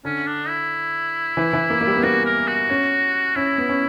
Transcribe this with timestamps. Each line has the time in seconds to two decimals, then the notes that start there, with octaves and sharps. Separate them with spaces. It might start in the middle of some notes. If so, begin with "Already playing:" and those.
0.05 D3 C#4
0.27 D4
0.49 E4
1.37 E3
1.53 E3
1.70 A#3
1.81 A#3
1.87 G3
1.97 B3
2.03 A#3 F#4
2.25 A#4
2.48 F#4
2.70 C#4
3.36 C#4 E4
3.58 B3
3.69 C#4